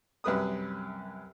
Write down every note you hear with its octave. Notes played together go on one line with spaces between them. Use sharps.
C2 F#2 B4 D#6